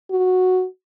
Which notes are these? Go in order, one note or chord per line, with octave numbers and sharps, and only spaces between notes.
F#4